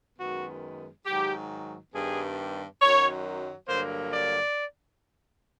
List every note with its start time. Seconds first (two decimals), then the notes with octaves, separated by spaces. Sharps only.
0.18 F#2 D#3 G#3 B3 F#4
1.06 G#2 D#3 F#3 G4
1.94 G2 D#3 G3 B3 G#4
2.82 F#2 D#3 F#3 C#5
3.69 G2 D3 F#3 A#3 C5
4.13 D5